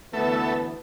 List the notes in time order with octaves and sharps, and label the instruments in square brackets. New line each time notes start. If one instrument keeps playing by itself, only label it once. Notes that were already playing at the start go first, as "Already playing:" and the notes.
[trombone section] D2 E3 B3 [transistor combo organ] A3 A4 E5